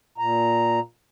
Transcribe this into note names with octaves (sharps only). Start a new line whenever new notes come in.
A#2 A#5